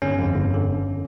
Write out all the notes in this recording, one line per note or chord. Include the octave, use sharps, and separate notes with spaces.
G1 C#4
F2 D3
G1
D3